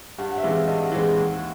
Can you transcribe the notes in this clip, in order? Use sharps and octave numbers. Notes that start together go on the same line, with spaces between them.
G2 F#5
F#5
E5
E3 G#3 C4 F5
E5
G2 D#5
F#5
E3 G#3 C4
D#2